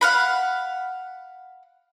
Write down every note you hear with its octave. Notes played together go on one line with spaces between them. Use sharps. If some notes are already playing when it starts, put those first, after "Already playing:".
F5 F#5 B5